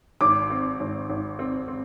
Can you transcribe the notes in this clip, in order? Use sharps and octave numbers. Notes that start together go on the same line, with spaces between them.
G#1 D6
C4
G#1
G#1
C4
C4